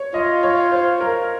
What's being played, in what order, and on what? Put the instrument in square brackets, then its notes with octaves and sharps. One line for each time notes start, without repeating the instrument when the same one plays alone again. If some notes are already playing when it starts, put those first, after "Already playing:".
Already playing: [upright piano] C#5
[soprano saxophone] F4 [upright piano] D#5
[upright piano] C#5
C5
A#4